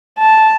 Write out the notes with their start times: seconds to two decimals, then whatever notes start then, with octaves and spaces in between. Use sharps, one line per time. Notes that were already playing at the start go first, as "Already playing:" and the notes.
0.18 A5